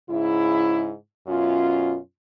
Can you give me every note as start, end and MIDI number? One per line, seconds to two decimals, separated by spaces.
0.10 0.93 44
0.10 0.93 49
0.10 0.93 64
1.28 1.98 42
1.28 1.98 47
1.28 1.98 61
1.28 1.98 65